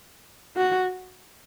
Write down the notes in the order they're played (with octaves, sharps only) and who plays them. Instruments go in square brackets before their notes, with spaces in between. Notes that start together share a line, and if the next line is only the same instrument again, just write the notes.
[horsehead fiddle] F#4